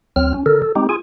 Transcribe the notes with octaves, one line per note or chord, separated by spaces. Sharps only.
D2 F#3 C4 F6
C#4
D3 A4 A#4
A4
G#3 C4 D#4 G4
F4 G#4 G#5